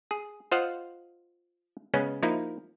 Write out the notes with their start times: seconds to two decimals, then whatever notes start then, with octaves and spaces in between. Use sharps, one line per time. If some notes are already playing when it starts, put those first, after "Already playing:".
0.11 G#4
0.52 F4 C5 D#5 F5 F#5
1.94 C#3 G#3 B3 C#4
2.23 F3 A#3 D#4 E4